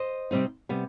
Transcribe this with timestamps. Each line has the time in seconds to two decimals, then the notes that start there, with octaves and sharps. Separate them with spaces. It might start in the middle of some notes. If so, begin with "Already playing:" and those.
Already playing: C5 D#5
0.31 C3 G3 C4 D#4
0.69 C3 G3 B3